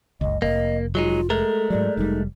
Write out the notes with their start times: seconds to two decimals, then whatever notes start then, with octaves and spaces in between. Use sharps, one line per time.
0.21 F#1 C#2 D#5
0.42 F1 A#3 D#5
0.95 F#3 G#3 D#4 F4
1.30 G#3 A3 A4 A#4
1.70 G#2 F#3 D5
1.97 F1 G3 D#4